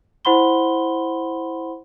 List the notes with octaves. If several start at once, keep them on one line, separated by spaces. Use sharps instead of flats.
E4 C5 F#5 B5 C6 G7